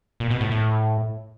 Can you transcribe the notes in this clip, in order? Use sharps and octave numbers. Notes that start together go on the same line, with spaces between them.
A#2
B2
A2
A2